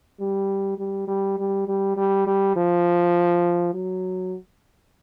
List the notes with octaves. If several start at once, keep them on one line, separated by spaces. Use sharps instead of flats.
G3
G3
G3
G3
G3
G3
G3
F3
F#3